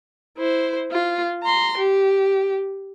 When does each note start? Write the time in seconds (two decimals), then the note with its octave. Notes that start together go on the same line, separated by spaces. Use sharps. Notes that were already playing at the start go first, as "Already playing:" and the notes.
0.37 E4 C5
0.91 F4
1.42 A#5 C6
1.77 G4